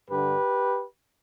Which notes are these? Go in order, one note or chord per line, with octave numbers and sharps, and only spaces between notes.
G2 D3 G4 B4